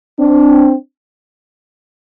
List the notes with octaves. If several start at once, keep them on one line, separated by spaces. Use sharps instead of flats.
C4 D4